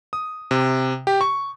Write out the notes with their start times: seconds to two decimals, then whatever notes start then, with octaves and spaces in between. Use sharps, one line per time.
0.13 D#6
0.51 C3
1.07 G4
1.21 C#6